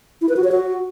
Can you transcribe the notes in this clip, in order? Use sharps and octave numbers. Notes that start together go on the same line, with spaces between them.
E4
B4
F#4
C#5
F#4